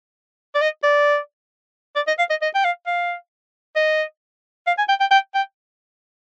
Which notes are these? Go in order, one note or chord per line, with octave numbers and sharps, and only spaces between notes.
D5
D#5
D5
D5
D#5
F5
D#5
D#5
G5
F5
F5
D#5
F5
G#5
G5
G5
G5
G5